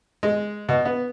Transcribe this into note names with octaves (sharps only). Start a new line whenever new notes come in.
G#3
B2
B3